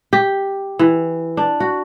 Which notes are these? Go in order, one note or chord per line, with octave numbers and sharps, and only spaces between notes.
G4
E3
D4
F#4